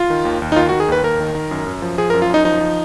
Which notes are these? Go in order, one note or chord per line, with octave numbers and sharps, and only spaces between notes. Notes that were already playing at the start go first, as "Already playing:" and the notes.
Already playing: F4
D#3
D#2
D#2
D#4
D#3 F4
F#4
D#3
G#4
D#2 B4
D#2 A#4
D#3
D#3
F#2
F#2
F3
F3 G#4
A#4
F#2
F4
F#2 D#4
F3 D#4
F3